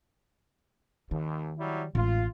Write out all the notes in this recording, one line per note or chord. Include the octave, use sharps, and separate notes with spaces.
D#2 D#3
F#3 G3 E4
A1 A2 G#3 F4